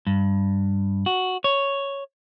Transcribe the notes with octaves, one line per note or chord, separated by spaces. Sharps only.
G2
F#4
C#5